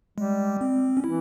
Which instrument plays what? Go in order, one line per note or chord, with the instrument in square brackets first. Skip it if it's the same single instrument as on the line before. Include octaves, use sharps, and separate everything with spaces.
[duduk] G3 [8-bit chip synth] G#3
[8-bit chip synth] C4
C#4
[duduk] E3 [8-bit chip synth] E4